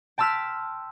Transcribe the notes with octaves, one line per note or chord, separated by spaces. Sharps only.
G5 A5 C6 E6 F6 B6